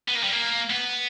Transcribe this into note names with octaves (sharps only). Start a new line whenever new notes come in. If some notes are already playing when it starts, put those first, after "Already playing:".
B3
A#3
G3
A#3
B3